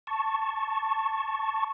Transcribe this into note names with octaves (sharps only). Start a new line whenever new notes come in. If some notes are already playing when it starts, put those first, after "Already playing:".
A5 C#6